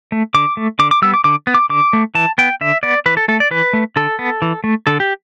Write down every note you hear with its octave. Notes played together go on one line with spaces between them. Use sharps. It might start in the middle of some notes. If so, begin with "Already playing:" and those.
A3
D3 D6
A3
D3 D6
D6
G3 B3 E6
D6
D3 D6
B3
D6
D3 D6
A3
E3 A5
B3 G5
D3 E5
B3 D5
E3 B4
A4
A3 A4
D5
E3 B4
A3
D3 A4
B3
E3
A3
D3 A4
G4